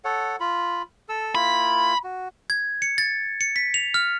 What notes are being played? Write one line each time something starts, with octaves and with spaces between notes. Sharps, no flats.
A4 C#5 F#5
F4 B5
A4 E6
A#3 E4 F4 B5
F#4
G#6
C#7
A6
C#7
B6
F7
F6